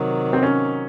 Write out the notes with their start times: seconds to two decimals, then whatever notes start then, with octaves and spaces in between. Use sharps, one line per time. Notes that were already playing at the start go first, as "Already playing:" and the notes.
Already playing: C3 D#3 F#3
0.33 C4
0.43 C#4